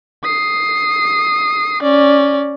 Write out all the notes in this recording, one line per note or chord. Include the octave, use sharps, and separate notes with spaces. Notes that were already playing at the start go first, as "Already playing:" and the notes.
D#6 C7
C#4 D5